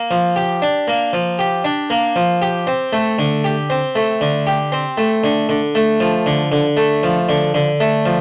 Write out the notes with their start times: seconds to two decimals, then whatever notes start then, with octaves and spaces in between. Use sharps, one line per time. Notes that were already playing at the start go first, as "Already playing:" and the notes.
Already playing: A#3
0.11 F3
0.36 G4
0.62 D4
0.88 A#3
1.13 F3
1.39 G4
1.64 D4
1.90 A#3
2.16 F3
2.42 G4
2.67 C4
2.93 A3
3.19 D3
3.44 G4
3.70 C4
3.95 A3
4.21 D3
4.47 G4
4.72 C4
4.98 A3
5.24 D3
5.49 D3
5.75 A3
6.00 F3
6.26 D3
6.52 D3
6.77 A3
7.03 F3
7.29 D3
7.54 D3
7.80 A3
8.05 F3